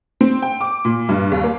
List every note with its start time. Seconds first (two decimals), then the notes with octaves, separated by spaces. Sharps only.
0.21 C4
0.42 G5
0.61 D6
0.85 A#2
1.09 G2
1.31 D#2
1.44 A#3